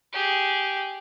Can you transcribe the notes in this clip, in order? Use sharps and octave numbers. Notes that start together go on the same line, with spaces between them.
G4 G#4